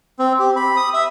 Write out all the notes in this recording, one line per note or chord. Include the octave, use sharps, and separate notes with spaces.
C4
G4
B5
D#6
E5